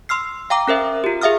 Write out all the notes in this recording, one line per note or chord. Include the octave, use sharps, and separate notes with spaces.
C6 E6 F6 C7
F5 G5 A#5 D6
C#4 A#4 C5 E5
F4 G4
G#4 E5 F5 D#6 F6